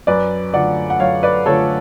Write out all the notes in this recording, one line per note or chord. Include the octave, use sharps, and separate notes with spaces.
F#2 B4 D5
D3 F3 A3 D5 F#5
F#5
F#2 C#5 F5
B4 D5
D3 F3 A3 A4 C#5